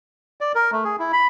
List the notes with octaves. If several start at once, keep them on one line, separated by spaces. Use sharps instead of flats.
D5
A#4
A3
G#4
E4
B5